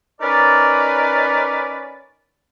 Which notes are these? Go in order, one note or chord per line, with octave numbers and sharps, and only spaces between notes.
C#4 D#4 A#4 B4 D5